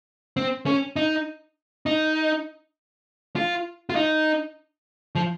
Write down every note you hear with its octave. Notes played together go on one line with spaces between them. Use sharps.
C4
C#4
D#4
D#4
F4
F4
D#4
F3